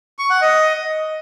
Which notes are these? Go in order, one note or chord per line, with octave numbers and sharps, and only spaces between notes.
C#6
F#5
D#5